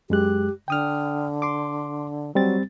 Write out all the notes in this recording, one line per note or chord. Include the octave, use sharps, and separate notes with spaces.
F#2 G#3 G4 F#6
D3 G5 D#6 F6
C6 D6
F#3 G3 C4 A6